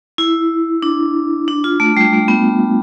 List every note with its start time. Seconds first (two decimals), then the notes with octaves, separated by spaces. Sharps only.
0.18 E4
0.83 D4
1.48 D4
1.64 F4
1.80 A3
1.97 G3
2.13 A3
2.28 B3